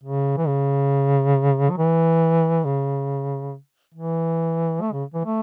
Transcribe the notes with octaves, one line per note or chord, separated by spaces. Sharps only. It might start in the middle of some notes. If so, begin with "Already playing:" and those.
C#3
E3
C#3
F#3
E3
C#3
E3
A3
C#3
E3
A3